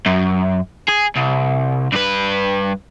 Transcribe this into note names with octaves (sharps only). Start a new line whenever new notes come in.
F#2
G#4
C2
G2 B4